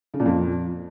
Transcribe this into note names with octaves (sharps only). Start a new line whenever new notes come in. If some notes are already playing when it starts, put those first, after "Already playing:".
C#3
A#2
F2